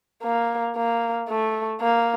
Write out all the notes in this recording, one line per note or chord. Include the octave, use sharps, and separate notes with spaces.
A#3
A#3
A3
A#3